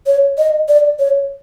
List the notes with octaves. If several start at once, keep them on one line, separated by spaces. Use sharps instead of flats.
C#5
D#5
D5
C#5